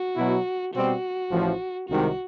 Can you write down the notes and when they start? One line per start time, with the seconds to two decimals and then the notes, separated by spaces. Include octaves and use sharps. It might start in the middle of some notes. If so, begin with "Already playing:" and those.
Already playing: F#4
0.16 B2 F#3 B3 E4
0.74 B2 G3 C4 F#4
1.31 A1 A2 F3
1.88 C2 C3 D#3 G#3 F#4